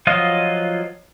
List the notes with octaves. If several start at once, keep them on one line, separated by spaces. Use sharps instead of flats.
F3 F#3 F4 D#5 F5